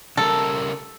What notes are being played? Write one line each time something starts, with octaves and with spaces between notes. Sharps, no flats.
C#3 G3 A4 A#4